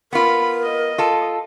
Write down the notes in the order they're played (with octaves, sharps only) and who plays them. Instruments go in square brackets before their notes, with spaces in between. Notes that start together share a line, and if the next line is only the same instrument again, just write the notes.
[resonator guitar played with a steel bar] B3 F4 [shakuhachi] A#4 [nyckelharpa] B5
[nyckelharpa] D#5
[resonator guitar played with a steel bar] F4 A4